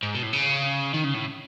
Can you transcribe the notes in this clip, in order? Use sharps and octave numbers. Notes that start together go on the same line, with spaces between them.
G#2
B2
A2
C#3
D#3
C#3
A2